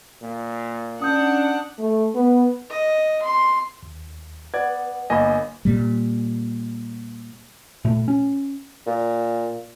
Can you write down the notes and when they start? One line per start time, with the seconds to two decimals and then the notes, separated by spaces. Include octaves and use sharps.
0.23 A#2
1.02 C#4 D4 F#5 D#6 G6
1.79 A3
2.15 B3
2.70 D#5
3.22 C6
3.83 D#2
4.54 B4 D5 F#5 G#6
5.10 G1 A#3 D#5 G#5 B5
5.65 A#2 G3
7.85 A#2 A3
8.08 C#4
8.87 A#2